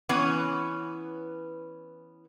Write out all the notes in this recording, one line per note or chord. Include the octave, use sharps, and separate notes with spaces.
E3 B3 C#4 B4 C#5